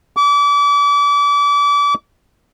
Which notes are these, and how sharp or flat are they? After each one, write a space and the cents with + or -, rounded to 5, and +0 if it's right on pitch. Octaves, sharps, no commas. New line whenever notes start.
D6 -35